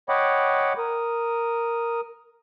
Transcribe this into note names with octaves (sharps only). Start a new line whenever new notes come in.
C#5 D#5 F#5 G5 B5 D6
A#4 D#6